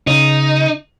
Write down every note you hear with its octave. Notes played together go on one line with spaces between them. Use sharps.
C#3 D#4